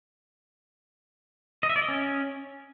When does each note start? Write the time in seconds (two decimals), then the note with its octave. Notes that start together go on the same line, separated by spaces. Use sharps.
1.63 D#5
1.69 E5
1.76 D5
1.82 D#5
1.88 C#4